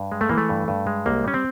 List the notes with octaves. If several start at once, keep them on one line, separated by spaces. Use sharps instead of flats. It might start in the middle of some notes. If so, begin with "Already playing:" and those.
Already playing: G2
G#3
A3
E3 A#3
A3
G2
G2
G#3
C2 A#3
G3 C#4
C4